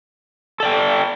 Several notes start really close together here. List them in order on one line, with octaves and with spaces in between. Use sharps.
A4 D5 G5